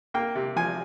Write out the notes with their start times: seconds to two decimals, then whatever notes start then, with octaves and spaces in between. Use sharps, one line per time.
0.14 A#3 G5
0.35 C3
0.56 F3 G#5